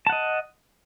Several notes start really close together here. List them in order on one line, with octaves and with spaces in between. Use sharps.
A5 F#5 D#5